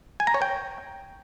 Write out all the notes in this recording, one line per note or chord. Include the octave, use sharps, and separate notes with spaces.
G#5
A#5
C#5
G5